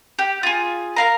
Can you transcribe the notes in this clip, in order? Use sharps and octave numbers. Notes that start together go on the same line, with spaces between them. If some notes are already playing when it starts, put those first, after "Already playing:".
G4
F4 G#4
A#4 F5 A#5